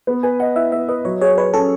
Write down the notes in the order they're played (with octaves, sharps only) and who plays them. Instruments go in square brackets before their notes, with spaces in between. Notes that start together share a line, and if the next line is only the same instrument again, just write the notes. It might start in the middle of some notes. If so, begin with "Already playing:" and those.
[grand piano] B3
[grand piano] B4 [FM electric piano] G#5
[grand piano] D#5 [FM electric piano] F#5
[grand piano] E4 [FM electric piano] E5
[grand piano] B3 [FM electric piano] E5
[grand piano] B4 [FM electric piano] D#5
[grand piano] F#3 [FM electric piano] C#5
[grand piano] G#4 [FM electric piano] C#5
[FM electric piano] B4 [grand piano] C#5
[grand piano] C#4 [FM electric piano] A4